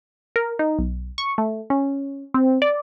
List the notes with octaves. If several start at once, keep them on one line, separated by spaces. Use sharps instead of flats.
A#4
D#4
B1
C#6
A3
C#4
C4
D5